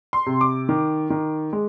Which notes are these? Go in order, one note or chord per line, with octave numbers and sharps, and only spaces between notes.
C6
C3
D6
D#3
D#3
G#3